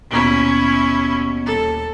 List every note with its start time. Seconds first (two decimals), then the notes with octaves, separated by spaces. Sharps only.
0.11 D#2 B2 C#4 E4 D7
1.46 D#1 A4